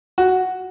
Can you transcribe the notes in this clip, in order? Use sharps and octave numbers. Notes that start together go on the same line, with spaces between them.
F#4